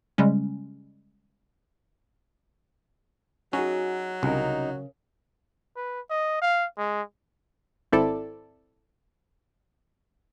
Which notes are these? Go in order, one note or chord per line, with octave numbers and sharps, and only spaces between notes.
C#3 G3 G#3 C#4
F#3 C#4 D#4 F#4 G#4
C2 C#3 C#4 D#4 A#4
B4
D#5
F5
G#3
G#1 C4 E4 A4 D5